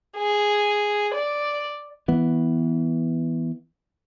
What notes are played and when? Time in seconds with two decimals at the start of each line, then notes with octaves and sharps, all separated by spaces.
0.17 G#4
1.14 D5
2.08 E3 B3